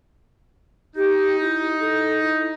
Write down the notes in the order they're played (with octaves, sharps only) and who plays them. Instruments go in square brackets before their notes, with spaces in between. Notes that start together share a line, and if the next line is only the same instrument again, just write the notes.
[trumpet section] D#4 [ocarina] G4
[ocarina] E4
A4
E4